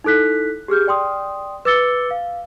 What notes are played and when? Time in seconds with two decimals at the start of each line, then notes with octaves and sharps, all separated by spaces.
0.04 D#4 E4 A4 F#6 B6
0.68 G4 G#4 F6 G6
0.87 D5 G5 C6 D#6
1.65 B4 D6 E6 A6 C#7 G7
2.11 F5